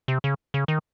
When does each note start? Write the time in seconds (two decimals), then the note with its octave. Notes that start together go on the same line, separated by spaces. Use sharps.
0.08 C3
0.24 C#3
0.54 C#3
0.68 D#3